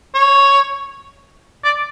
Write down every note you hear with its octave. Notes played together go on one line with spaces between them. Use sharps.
C#5
D5